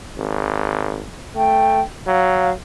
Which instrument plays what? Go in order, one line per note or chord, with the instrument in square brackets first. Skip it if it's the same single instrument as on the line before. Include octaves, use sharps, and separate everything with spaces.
[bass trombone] G#1
[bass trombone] A3 [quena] G5
[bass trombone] F#3 [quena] F5